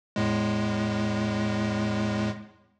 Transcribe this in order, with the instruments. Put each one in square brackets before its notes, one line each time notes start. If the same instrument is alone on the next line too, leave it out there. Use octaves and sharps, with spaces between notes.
[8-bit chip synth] E2 A2 G#3